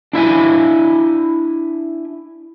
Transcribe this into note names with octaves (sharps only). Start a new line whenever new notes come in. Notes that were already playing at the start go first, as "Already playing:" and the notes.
D4 E4 E5 G#5